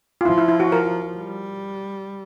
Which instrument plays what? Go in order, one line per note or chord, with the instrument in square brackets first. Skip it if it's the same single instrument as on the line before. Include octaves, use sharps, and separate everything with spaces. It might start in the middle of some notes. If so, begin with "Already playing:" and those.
[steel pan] F4
[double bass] F3 [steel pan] E4
[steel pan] E4
E4
F#4
A#4
[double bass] G3